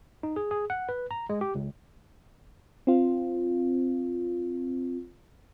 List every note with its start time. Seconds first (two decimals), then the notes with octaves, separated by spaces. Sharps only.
0.23 D#4
0.36 G#4
0.51 G#4
0.70 F#5
0.89 B4
1.11 A#5
1.29 G#3
1.41 G4
1.55 C#2
2.87 C4 F4